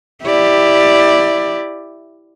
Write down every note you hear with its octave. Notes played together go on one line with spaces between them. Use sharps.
E4 G4 D5